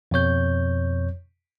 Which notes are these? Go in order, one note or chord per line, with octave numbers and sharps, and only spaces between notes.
F2 B2 C#5 G6